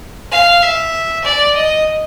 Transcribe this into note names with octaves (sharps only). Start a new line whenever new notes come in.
F5
E5
D5
D#5